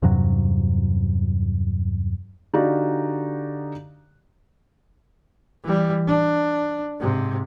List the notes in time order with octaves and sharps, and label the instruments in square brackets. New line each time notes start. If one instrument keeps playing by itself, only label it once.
[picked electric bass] E2 G2 C3 F#3
[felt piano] D3 D#4 F#4 G4 D5 F5
[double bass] E3 G3
D4
G#2 C3